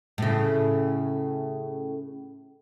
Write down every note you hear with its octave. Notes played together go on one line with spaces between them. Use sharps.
A2 C#3